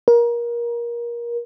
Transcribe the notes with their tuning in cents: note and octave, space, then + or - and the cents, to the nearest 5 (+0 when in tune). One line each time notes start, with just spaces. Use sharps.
A#4 +25